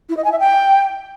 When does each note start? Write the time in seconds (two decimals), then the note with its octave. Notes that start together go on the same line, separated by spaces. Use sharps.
0.09 E4
0.17 D#5
0.24 G#5
0.32 E5
0.39 G5